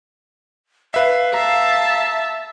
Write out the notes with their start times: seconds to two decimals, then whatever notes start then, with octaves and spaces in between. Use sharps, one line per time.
0.94 B4 E5 F5
1.34 E5 A5 A#5